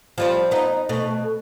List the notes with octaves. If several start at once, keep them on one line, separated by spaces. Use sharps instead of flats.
F3 G3 C4
B3 D#4
B2 A3